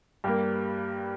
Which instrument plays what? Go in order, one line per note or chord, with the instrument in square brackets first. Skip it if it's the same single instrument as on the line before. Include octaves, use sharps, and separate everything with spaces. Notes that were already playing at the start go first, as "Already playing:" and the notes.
[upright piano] G2 G3 A#3 G4